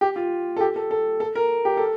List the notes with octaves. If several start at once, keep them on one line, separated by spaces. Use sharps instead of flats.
G4
F4
A4
G4
A4
A4
A4
A#4
G4
A4